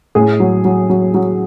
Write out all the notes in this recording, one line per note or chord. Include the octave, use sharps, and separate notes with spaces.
A2 G#4
F#3
F#3
F#3
F#3